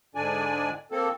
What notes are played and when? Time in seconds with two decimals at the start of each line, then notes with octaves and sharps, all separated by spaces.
0.15 G#2 D3 D4 D5 G#5
0.91 A#3 C4 A4